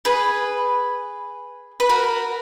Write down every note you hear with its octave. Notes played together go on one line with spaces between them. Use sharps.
G#4 B4
B4
F#4 A#4